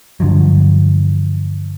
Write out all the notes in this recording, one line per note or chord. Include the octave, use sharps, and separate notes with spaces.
G2 D3 F3 F#3